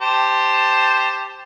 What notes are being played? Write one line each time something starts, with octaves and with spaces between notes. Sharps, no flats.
G4 C5 A5